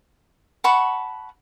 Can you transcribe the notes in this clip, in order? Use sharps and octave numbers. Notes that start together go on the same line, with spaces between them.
F#5 A5 B5 C#6